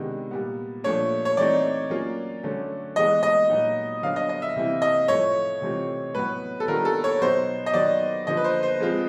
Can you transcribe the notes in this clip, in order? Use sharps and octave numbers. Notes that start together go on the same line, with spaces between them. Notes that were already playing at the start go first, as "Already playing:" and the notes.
Already playing: C3 D#3 G#3 B3 D4
A#2 G3 B3
A#2 F3 A3 D4 C#5
C#5
E3 A3 C4 D#4 D5
F#3 A#3 C#4 F4
D3 F#3 A3 C#4
E3 G#3 B3 D#5
D#5
A#2 F#3 B3 D#4
D3 F#3 B3 D4 F5
D#5
D#5
E5
C3 E3 G3 C4 E4
D#5
A2 F3 A3 C#5
C3 E3 A3 C4 F4
A2 F#3 B3 B4
A4
D#3 G3 B3 D4 F4 A#4
A4
C#5
B2 F#3 B3 D#4 C5
D#5
D#3 F#3 B3 D5
D3 F3 A#3 D#5
B4
C5
C5
F3 G#3 C4 F4